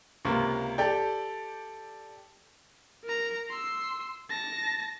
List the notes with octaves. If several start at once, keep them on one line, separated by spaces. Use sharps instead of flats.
C#2 C3 A#3
G4 A4 D5 G5
A#4 A#5
C6 E6
A5 A#6